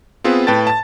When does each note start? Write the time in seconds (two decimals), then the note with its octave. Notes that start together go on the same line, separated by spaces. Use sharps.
0.24 B3 C4 F4 G#4 B4
0.47 A2 B4 G5 A5 A6
0.67 A5 A6